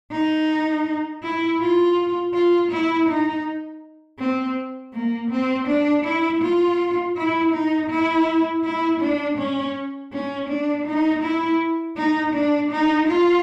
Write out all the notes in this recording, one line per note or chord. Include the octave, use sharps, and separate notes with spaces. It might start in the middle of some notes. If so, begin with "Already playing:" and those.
D#4
E4
F4
F4
E4
D#4
C4
A#3
C4
D4
E4
F4
E4
D#4
E4
E4
D4
C#4
C#4
D4
D#4
E4
D#4
D4
D#4
F4